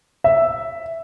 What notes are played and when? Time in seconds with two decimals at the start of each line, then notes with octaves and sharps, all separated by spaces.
0.24 E5